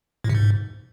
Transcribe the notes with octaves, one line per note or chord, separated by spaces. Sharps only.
A2
C3
G#2